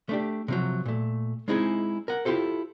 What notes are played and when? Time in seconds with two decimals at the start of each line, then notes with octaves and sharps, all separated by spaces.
0.09 A3 D4 G4
0.48 C3 F3 F#3
0.86 A#2 A3
1.48 G#3 C4 D#4 E4 G#4
2.08 A#4 F#5
2.25 E4 F4 G4 A4 C5